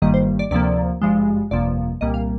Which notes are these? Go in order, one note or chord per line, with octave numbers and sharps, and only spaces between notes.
G1 G2 D#3 G3 A#3 D#5
C5
D5
D2 C3 F3 A#3 D5
G#1 G2 F3 G#3
G1 F2 C3 F3 A#3 D5
C2 A#2 G3 A#3 D#5
F5